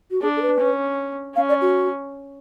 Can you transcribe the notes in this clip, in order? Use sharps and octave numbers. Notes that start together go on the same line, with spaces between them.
F#4
D4 G#4
A4
B4
C#4
C#4 F5
D5
F#4